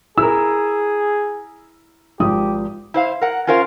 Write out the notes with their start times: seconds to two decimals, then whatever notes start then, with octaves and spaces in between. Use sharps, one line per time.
0.18 E4 G#4 A#4 E6
2.20 G#1 F3 G4 D#6
2.94 E4 C5 F5
3.21 A#4 F#5
3.47 C#4 F4 A#4 C5 F5